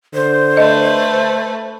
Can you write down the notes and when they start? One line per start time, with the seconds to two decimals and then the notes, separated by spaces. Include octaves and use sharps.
0.14 D3 C5
0.57 A3 B4 D#5